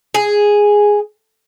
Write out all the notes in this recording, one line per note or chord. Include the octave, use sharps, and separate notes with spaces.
G#4